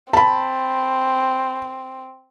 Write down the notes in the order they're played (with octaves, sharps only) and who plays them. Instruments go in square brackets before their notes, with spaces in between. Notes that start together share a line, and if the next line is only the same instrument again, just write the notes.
[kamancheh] C4 [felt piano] A5 B5